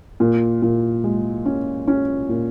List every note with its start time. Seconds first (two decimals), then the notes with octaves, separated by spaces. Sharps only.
0.20 A#2
0.62 A#2
1.04 G#3
1.45 C#4
1.87 C#4
2.29 A#2